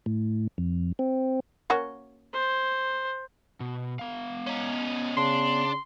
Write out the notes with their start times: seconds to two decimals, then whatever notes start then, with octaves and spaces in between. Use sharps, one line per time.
0.06 A2
0.58 F2
0.99 C4
1.70 A#3 C#4 F#4
2.34 C5
3.60 B2
3.99 B3 F5
4.47 C#4 D#4
5.17 C#3 D4 C6